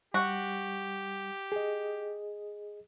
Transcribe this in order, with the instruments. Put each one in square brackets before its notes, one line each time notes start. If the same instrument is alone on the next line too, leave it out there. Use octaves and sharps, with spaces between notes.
[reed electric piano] G3 [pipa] F#4 [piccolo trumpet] G4
[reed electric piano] G#4 D#5